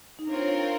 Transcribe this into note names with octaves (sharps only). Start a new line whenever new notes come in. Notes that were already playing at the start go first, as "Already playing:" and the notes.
D#4
C4 D4 F4 A#4 C#5